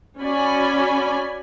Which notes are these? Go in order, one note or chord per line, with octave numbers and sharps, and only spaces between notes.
C#4 F#4 D5 G#5 B5